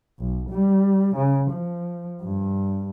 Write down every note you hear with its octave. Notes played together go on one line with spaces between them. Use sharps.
B1
G3
C#3
F3
G2